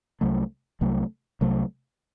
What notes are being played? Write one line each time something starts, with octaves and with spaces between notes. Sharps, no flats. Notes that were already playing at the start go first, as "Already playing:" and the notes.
C2 C3 F#3 A3
C2 C3 F#3 A3
C2 C3 F#3 A3